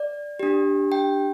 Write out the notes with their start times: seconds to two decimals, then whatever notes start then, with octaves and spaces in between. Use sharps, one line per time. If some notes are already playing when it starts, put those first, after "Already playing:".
Already playing: D5
0.39 D4 G4
0.92 G5